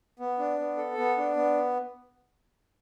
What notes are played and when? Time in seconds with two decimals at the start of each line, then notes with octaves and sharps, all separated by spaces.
0.19 B3
0.39 D4
0.59 B3
0.77 A4
0.98 B3
1.18 D4
1.36 B3